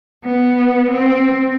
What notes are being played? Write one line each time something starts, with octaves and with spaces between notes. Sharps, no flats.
B3
C4